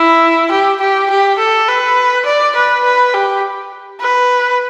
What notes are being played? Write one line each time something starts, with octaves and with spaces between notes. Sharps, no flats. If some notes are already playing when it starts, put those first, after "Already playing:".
Already playing: E4
G4
G4
G4
A4
B4
D5
B4
B4
G4
B4